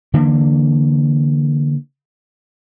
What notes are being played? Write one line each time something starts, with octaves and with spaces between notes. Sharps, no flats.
D3 E3 A#3